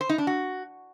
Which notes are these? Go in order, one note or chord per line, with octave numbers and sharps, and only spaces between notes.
C5
D#4
D4
F#4